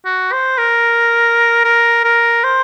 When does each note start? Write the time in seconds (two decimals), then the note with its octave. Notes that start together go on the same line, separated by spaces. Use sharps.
0.06 F#4
0.32 C5
0.58 A#4
1.65 A#4
2.04 A#4
2.44 C5